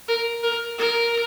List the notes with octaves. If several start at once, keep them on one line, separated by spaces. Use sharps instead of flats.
A#4
A#4
A#4